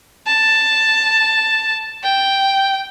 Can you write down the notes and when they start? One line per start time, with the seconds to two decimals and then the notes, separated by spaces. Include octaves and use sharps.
0.27 A5
2.04 G5